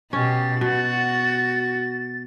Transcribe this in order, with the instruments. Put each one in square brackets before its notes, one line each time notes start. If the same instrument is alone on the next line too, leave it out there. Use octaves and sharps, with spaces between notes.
[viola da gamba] B2 G4 [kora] C#4 [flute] A6
[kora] B2 [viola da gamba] F#4